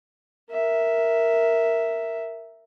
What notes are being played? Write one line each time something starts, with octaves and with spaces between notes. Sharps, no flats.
A#4 E5